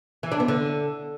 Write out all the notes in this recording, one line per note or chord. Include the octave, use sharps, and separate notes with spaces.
E3
D4
B3
D3